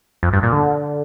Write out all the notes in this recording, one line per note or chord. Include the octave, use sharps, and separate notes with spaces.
F2
G2
A#2
D3